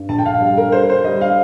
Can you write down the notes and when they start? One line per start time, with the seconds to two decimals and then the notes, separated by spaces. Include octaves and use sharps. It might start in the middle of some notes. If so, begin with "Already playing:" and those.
Already playing: G2
0.09 A#1 A5
0.19 G5
0.26 F5
0.40 G3
0.57 A#4
0.72 G3 C5
0.90 C5
1.04 G3 D#5
1.21 F5